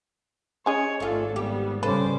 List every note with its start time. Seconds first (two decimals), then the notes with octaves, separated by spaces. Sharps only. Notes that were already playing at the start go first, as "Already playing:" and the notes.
0.66 C#4 G#4 C#5 D#5
1.00 G#1 A3 D4 F4 A4
1.36 G3 B3 G4
1.83 C#3 G3 C#4 A4 B4 C5 D6